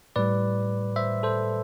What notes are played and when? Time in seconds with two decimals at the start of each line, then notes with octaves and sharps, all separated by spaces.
0.16 A2 G3 B4 D5
0.96 C5 E5
1.23 A4 C5